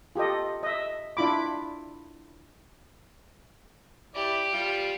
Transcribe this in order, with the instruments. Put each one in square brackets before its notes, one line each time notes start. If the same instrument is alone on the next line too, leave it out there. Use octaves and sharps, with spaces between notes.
[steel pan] F4 G4 A4 D#5
D#5 E5
D4 E4 F4 B5 D6
[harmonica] E4 D5 [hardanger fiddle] G4
[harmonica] G3 F4